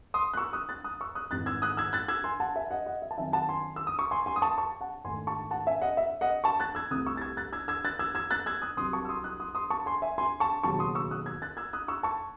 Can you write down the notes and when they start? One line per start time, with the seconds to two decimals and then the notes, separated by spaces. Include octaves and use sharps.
0.14 C6 D#6
0.34 F#6
0.37 C#6 E6
0.53 D#6 F#6
0.69 F#6 A6
0.84 D#6 F#6
1.01 C#6 E6
1.15 D#6 F#6
1.31 G#1 G#2 E3 F#6 A6
1.46 E6 G#6
1.62 D#6 F#6
1.77 E6 G#6
1.93 F#6 A6
2.08 E6 G#6
2.24 G#5 C6
2.40 F#5 A5
2.56 E5 G#5
2.71 D#5 F#5
2.86 D#5 F#5
3.02 E5
3.11 A5
3.18 F#2 D#3 F#3 C4 D#4 E5 G#5
3.33 F#5 A5
3.49 G#5 C6
3.76 E6
3.87 D#6
3.99 C#6
4.11 G#5 C6
4.26 G#5 C6
4.36 D#6
4.42 A5 C#6
4.58 A5 C#6
4.81 F#5 A5
5.04 G#2 D#3 A3 G#5 C6
5.27 A5 C#6
5.51 F#5 A5
5.67 E5 G#5
5.82 D#5 F#5
5.97 E5
6.21 D#5 F#5
6.44 A5 C#6
6.60 F#6 A6
6.75 E6 G#6
6.91 C2 C3 E3 A3 D#6 F#6
7.06 C#6 E6
7.17 A6
7.21 E6 G#6
7.37 F#6 A6
7.53 E6 G#6
7.68 E6 G#6
7.84 F#6 A6
7.99 E6 G#6
8.15 E6 G#6
8.30 F#6 A6
8.46 E6 G#6
8.62 D#6 F#6
8.77 C2 C3 F#3 C6 D#6
8.93 A5 C#6
9.05 E6
9.09 C6 D#6
9.24 D#6 F#6
9.40 C6 D#6
9.55 C6 D#6
9.70 A5 C#6
9.86 G#5 C6
10.02 E5 G#5
10.18 G#5 C6
10.40 A5 C#6
10.63 E1 D#2 C#3 F#3 A5 C#6
10.79 C6 D#6
10.95 C#6 E6
11.11 D#6 F#6
11.26 E6 G#6
11.42 F#6 A6
11.57 E6 G#6
11.73 D#6 F#6
11.88 C#6 E6
12.03 A5 C#6